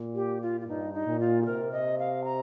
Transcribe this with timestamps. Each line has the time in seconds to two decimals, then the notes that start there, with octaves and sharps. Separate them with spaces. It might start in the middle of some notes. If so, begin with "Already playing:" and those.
Already playing: A#2
0.15 G4
0.42 F4
0.61 F4
0.67 G2 D#4
0.94 D#4
1.07 A#2
1.20 F4
1.43 G4
1.45 C3 A#4
1.72 D#5
1.99 F5
2.24 A#5